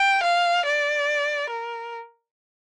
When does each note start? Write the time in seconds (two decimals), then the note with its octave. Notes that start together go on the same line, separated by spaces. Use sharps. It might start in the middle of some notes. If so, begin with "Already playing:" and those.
Already playing: G5
0.23 F5
0.66 D5
1.50 A#4